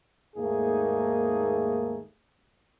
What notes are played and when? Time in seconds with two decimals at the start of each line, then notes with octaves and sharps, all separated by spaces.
0.36 D#2 G#2 A3 A#3 D#4 G#4